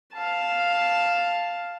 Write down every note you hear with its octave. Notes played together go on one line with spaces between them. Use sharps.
F5 A5